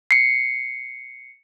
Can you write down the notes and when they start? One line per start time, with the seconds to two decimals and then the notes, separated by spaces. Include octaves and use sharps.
0.11 C7 C#7